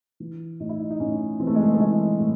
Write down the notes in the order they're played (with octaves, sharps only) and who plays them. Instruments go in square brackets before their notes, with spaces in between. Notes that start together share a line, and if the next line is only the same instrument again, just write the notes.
[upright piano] E3
A2 D#4
E4
D#4
D#4
A2 C#4
E3 C4
A3
G#3
A3
A3
E3 G#3
A2